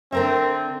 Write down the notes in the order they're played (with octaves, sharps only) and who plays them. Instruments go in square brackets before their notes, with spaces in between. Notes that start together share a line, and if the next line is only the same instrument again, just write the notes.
[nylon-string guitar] D3 A#4 E5 [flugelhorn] C4